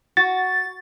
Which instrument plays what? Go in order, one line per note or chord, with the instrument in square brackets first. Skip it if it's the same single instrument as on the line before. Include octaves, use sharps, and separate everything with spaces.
[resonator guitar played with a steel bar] F#4 [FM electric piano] A6